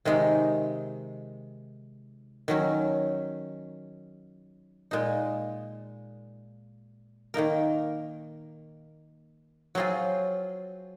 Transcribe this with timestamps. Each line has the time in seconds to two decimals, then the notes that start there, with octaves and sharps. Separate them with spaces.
0.05 C3 D#3 G#3 D#4
2.48 D#3 F#3 C#4
4.91 A#2 G#3 D#4
7.34 D#3 A#3 D#4 A#4
9.75 F#3 C4 F4 G#4